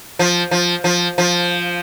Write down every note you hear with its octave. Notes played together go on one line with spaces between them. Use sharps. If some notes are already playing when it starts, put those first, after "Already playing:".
F3
F3
F3
F3